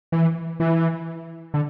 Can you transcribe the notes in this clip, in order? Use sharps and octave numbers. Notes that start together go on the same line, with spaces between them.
E3
E3
D3